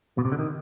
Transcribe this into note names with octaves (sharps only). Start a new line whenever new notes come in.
B2
C3
D3
D#3